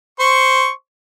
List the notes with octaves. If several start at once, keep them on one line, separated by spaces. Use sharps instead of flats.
C5 C6 C#6